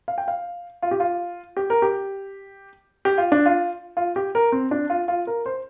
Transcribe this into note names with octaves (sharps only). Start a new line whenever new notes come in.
F5
G5
F5
F4
G4
F4
G4
A#4
G4
G4
F4
D4
F4
F4
G4
A#4
C4
D4
F4
F4
A#4
C5